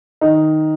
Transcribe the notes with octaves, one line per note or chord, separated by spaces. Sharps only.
D#3 D#4